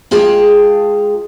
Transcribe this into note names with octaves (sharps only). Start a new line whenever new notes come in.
G#3 F4 G#4 F5 G5 A5